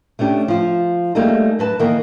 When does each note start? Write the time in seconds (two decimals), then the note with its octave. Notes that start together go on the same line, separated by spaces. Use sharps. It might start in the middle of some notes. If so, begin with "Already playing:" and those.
0.19 A3 C#4 D4 G4
0.48 F3 F4
1.15 G3 A3 A#3 D#4 G#4 A4
1.59 F#3 B4 A5
1.79 D#3 E3 A#3 B3 D#4 A#4